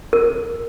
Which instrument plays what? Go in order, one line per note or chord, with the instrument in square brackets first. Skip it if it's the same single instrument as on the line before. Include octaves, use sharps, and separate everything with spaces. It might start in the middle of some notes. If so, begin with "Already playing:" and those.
[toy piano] A#4